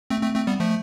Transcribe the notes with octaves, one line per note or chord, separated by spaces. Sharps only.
A3 C4
A3 C4
A3 C4
G3 B3
F3 A3